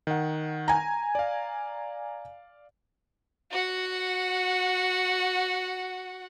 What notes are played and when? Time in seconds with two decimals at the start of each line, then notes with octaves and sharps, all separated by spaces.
0.07 D#3 F#5
0.68 G#5 A#5
1.15 D5 F5
3.51 F#4 F#5